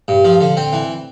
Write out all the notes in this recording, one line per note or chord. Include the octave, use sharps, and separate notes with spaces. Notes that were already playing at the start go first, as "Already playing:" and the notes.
G2
F3
D3
C4
E3